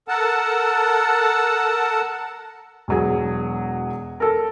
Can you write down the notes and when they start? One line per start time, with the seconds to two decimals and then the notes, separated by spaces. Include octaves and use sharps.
0.08 A4 A#4 F#5 A5
2.88 E1 F#3 G#4
4.20 A4 A#4